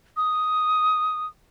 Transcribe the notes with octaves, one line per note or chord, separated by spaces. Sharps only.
D#6